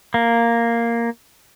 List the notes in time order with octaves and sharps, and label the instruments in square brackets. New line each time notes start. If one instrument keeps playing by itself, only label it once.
[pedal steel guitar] A#3